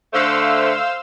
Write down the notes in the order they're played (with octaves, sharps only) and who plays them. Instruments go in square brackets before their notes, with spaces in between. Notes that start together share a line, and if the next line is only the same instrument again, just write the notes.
[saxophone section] D3 A3 [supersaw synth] C5 F5 E6